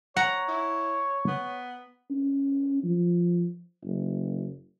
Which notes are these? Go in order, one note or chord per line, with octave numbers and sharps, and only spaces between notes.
C#5 F#5 A#5
E4
B3
C#4
F3
F#1